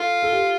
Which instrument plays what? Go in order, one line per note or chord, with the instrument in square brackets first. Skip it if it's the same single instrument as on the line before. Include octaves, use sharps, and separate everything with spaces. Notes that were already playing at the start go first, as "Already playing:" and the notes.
Already playing: [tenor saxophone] F4 [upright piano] A4
[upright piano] A4
G4